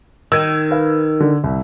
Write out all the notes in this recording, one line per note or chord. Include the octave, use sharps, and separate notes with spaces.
D#3 E6 G#6
B4 F5
D3
C2